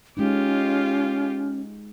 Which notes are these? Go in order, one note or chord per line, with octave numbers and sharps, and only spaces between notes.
G#3 C#4 D#4 F4 G4